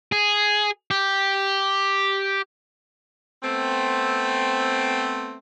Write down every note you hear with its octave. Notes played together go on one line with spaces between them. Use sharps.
G#4
G4
A3 B3 C4